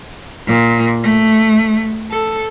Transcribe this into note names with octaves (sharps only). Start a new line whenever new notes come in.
A#2
A3
A4